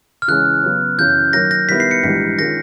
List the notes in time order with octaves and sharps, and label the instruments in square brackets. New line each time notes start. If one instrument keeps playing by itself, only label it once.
[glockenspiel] F6
[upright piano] C#3 E3 G#3 C#4 [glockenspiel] F#6
[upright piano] C#3 F#3 B3
[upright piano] F#2 C#3 E3 [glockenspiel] G6
[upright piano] D#3 F#3 A#3 [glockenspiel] A#6
[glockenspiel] A#6
[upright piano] D#3 G3 B3 E4 [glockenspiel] B6
[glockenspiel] C7
C#7
[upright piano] A#1 G#2 E3 G3 [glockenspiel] B6
[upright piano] D#3 G#3 C#4 F4 [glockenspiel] A#6